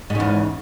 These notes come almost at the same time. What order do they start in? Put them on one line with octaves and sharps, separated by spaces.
G#2 C#3 E2